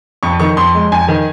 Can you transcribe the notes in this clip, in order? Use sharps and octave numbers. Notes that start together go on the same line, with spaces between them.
F2 C#6
D#3 C#6
F2 C6
G#3
F2 G#5
D#3